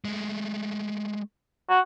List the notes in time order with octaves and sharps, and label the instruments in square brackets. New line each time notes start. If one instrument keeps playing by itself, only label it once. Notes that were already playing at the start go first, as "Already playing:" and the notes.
[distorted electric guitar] G#3 A3
[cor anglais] F#4